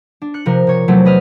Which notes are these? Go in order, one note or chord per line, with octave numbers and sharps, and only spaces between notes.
D4
F#6 C#7
C3 F3 A#4
C3 C#5 C#7
E2 C3 F#3 A3 C4
B4 D#5 F6